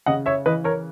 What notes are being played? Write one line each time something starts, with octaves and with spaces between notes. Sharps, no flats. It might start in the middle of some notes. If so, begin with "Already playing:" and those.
C#3 D#5 F#5
C#5 E5
E3 B4 D#5
A#4 C#5